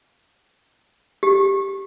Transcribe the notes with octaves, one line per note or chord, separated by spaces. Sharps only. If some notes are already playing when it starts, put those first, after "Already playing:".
G4